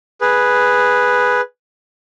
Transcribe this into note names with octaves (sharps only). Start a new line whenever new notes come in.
G#4 B4